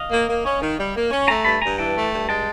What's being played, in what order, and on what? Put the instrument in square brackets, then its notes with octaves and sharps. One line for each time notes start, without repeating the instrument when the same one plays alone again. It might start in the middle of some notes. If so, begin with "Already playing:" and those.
Already playing: [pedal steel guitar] D#5 F5
[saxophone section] A#3
A#3
C#4
D#3
G3
A#3
C#4
[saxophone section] A3 [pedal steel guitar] G#5 A#5
[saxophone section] G2 [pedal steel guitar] A5 B5
[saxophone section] G2 [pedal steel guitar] G#5 A#5
[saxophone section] E3 [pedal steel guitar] G5 A5
[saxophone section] A3
G2
[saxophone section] G#3 [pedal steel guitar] G5 A5